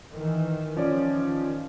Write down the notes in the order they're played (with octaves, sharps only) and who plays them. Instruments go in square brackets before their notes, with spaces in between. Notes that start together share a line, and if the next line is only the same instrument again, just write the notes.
[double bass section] D#3 E3
[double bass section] D#3 [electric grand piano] F3 C#4 D5